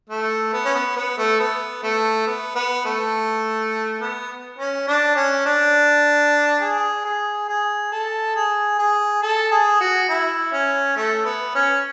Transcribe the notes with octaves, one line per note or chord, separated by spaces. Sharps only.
A3
B3
C#4
B3
B3
A3
B3
A3
B3
B3
A3
B3
C#4
D4
C#4
D4
G#4
G#4
G#4
A4
G#4
G#4
A4
G#4
F#4
E4
C#4
A3
B3
C#4